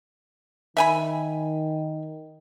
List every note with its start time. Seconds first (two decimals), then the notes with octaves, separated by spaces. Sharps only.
0.77 D#3 E5 G#5 B5